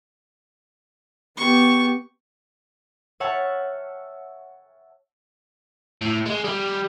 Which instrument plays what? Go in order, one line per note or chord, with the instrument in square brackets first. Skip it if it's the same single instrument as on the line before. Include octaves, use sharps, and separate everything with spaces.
[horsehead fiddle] B3 G4 [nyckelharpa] C#6
[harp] C#5 E5 F#5 A5 F6
[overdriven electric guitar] A2
G#3
G3